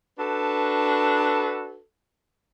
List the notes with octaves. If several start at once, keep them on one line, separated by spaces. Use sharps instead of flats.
D4 F#4 A4 B4